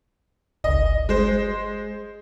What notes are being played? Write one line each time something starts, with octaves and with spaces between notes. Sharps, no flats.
G1 C#2 D#5
G#3 C5